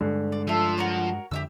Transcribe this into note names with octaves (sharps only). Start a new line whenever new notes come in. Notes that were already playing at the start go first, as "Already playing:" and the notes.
G2 D3 G#3
D5
F3 A4 E5
F#4 A#4 C#5
F2 D3 G4 E5 E6